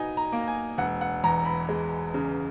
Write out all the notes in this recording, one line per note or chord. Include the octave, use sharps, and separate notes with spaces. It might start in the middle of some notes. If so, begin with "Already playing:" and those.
Already playing: B2 D#4 G#5
A#5
A#3
G#5
E1 F#5
F#5
E2 A#5
B5
G#3
C#3